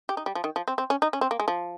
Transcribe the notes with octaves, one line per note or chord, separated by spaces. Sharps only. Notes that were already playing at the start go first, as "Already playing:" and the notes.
G4
D#4
G3
F3
D#3
F3
C4
C4
C#4
D#4
C#4
C4
A#3
G#3
F3